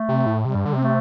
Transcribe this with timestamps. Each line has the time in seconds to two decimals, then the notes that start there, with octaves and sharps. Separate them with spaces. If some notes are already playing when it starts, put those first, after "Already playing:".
Already playing: A3
0.09 C3
0.26 A2
0.45 C3 G3
0.55 G2
0.65 D3
0.73 C3 C4
0.83 A3